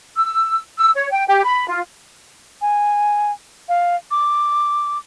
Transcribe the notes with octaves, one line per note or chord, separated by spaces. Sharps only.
E6
E6
C#5
G5
G4
B5
F4
G#5
F5
D6